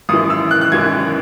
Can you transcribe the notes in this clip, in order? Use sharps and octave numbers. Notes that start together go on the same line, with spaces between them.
G#1 F#2 E3 D#6
E6
F#6
F#6
G#1 F#2 E3 G#6